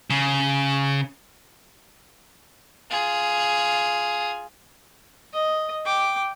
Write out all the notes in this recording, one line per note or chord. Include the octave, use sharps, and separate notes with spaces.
C#3
F4 G#4
D#5
G5 D6